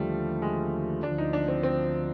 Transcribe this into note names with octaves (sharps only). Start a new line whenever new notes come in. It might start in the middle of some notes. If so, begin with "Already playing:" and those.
Already playing: D#2 D3 F3 G3 A3
G#3
D2 D3 F3 D4
D#4
D4
C4
C4